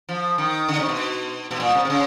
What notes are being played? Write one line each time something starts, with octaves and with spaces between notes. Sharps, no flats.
F3
D#3
D3
C3
B2
B2
A#2
C3
C3
C#3